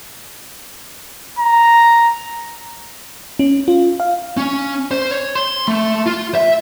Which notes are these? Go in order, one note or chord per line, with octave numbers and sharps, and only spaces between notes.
A#5
C#4
F4
F5
C#4
C5
C#5
C6
A3
F4
E5